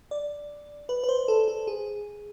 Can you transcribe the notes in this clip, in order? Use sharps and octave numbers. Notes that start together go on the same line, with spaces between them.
D5
B4
B4
C5
A4
A4
G#4